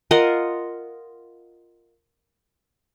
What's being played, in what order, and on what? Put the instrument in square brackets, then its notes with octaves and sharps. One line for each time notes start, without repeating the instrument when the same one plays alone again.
[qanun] F4 A#4 D#5 F#5